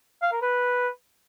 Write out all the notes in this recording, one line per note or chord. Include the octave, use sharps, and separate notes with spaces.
F5
A#4
B4